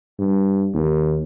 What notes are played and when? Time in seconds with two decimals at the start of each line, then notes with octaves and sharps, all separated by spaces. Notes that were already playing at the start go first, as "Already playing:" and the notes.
0.19 G2
0.74 D#2